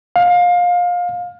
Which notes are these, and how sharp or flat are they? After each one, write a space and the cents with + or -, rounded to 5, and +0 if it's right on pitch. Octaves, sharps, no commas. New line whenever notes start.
F5 +25